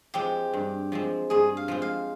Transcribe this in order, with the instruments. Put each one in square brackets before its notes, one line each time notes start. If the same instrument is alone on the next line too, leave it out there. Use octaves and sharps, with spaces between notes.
[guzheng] F3 G#3 C4 [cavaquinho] G4
[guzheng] G2
F3 G#3 C4
[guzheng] G2 [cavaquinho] G#4
[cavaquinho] F5
[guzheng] F3 G#3 C4
[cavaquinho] F5